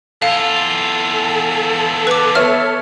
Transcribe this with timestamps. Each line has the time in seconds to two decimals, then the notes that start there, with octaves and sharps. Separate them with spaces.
0.22 E2 F4 A4 F5
2.07 B4 D6
2.35 B3 C#5 E5 F6